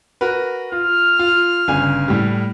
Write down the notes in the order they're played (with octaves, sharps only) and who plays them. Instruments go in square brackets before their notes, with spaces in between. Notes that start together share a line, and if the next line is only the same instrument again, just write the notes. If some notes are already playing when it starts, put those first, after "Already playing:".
[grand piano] F#4 A#4 B4
[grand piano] F4 [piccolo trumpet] F6
[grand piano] F4
G1 C#3 G#5
A2 G3